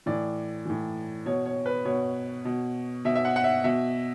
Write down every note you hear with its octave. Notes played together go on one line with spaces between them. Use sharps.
A2 E3 D5
A2 E3
B2 C#5
C#5
B4
B2 C#5
B2
B2 E5
E5
F#5
F#5
E5
B2 E5